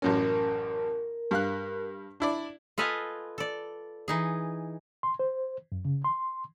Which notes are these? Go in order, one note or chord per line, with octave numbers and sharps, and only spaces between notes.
A1 F#2 C#4 A#4
G2 F5 F#6
D4 E4 D5
F4 A4 B4 D#5 F5 G#5
A4 D5
E3 D#4 G#4
C6
C5
F#2
C#3
C6